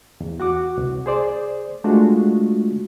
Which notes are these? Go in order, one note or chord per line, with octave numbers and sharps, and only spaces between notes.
E2
F#4 F#5 D6
C2
G#4 C5 D5
G#3 A3 D4 F4 F#4